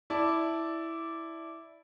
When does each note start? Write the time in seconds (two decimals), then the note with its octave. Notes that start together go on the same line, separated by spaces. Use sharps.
0.10 E4 D5 A5